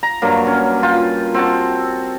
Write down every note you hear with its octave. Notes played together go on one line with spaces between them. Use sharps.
A#5
G2 F#3 A#3
C#4
F4 G5
C4 F#4 A5